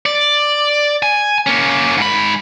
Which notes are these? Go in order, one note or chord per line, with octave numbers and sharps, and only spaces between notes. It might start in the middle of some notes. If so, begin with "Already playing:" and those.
D5
G#5
A#3 C#4
G#2 B5